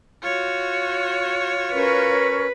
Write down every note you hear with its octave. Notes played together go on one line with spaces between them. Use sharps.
F4 F#4 C#5
C#4 A#4 B4 C#6